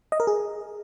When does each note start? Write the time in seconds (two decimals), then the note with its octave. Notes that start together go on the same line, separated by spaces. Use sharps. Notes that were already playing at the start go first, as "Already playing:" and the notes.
0.12 D#5
0.20 A#4
0.27 G#4